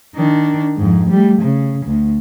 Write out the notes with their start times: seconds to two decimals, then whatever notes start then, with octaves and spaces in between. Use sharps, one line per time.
0.16 D#3 D4
0.77 F2 G#2
1.10 G3 A3
1.42 C#3
1.86 D2